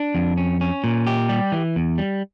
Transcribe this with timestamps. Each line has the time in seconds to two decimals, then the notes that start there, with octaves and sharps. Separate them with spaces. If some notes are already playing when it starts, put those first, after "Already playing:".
Already playing: D4
0.15 F2
0.37 C#4
0.61 C#4
0.84 A#2
1.07 G4
1.29 G3
1.52 E3
1.76 E2
1.98 G3